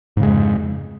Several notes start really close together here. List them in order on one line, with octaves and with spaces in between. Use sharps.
G#2 C#3 G#3 F2